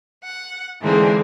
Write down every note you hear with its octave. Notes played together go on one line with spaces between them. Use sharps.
F#5
G#2 D3 E3 G#3 A#3 C4